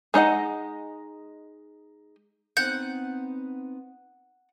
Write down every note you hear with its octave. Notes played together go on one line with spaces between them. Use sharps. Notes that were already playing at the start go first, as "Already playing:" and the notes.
G#3 D#4 D#5 F#5
B3 C4 D#4 F#5 G6